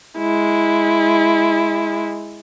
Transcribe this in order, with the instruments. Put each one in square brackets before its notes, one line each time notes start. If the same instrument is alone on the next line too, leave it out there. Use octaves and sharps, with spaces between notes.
[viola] G#3 E4